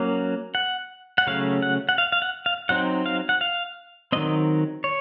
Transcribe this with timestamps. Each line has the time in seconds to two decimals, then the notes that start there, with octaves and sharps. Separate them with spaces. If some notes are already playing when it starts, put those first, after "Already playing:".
Already playing: F#3 A#3 C#4
0.55 F#5
1.18 F#5
1.27 C#3 F#3 A3 C#4 F5
1.62 F#5
1.89 F#5
1.98 F5
2.12 F5
2.22 F#5
2.46 F5
2.69 F#3 C4 D#4 F#5
3.06 F5
3.29 F#5
3.41 F5
4.12 D#3 F#3 C4 D#5
4.84 C#5